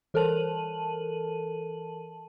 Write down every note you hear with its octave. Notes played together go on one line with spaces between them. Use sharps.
E3 A4 A#4 A5 D#7 F#7